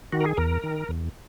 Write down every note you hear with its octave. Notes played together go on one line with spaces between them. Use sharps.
D#3 F#4
A#4
G#4
E2 A#4
D#3
E2